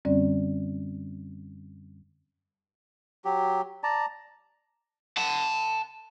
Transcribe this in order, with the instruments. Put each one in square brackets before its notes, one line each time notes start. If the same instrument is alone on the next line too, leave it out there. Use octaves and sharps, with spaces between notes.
[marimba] F#2 D3 G3 C4 C#4 D5
[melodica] F#3 G4
D5 A5 A#5
[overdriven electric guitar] F#5 A5